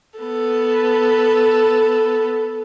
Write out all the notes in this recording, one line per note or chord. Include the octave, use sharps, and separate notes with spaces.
B3 A4